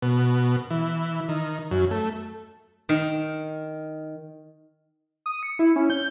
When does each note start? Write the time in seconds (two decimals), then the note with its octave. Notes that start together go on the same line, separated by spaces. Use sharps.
0.02 B2
0.70 E3
1.29 D#3
1.71 F#2
1.91 A3
2.89 D#3
5.26 D#6
5.43 C#7
5.59 E4
5.76 C#4
5.90 G6